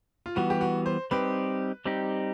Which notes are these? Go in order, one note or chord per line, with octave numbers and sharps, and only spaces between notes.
F4
E3 G3 B3 F#4
G4
F#4
C5
G3 C4 D#4 G4 B4
G3 C4 D#4 G4